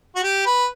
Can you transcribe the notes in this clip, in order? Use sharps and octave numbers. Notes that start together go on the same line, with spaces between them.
F#4
G4
B4